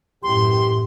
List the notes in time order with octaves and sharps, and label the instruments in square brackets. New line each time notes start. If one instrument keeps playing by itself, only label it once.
[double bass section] F#2 A2 [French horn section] E3 G4 [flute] C6